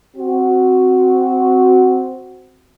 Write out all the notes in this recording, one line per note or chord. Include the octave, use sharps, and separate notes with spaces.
C4 F#4